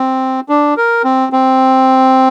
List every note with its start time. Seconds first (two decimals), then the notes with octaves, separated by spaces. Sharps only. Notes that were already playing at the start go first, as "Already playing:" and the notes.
Already playing: C4
0.49 D4
0.77 A#4
1.04 C4
1.33 C4